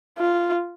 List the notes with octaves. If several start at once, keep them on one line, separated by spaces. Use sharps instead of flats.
F4